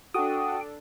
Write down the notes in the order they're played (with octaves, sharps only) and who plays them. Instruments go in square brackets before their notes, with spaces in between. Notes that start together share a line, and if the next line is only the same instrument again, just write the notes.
[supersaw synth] D4 A4 [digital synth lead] F#4 [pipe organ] G5 [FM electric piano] D#6